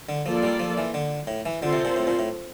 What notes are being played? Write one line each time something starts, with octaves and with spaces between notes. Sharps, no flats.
D3
F3 A#3 F4 A4 D5
G3
F3
E3
D3
A2
E3
D3 C4 F4 A4 C5
C3
A#2
A2
A#2
A2